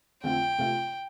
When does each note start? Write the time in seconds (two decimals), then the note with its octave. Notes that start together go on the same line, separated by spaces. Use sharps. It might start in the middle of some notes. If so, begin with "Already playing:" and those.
0.23 F2 D3 A3 C4 F4 G5
0.59 C3 A3 F4